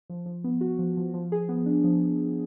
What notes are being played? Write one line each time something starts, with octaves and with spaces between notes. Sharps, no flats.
F3
F3
B3
F#4
F3
F3
F3
G#4
B3
D4
F3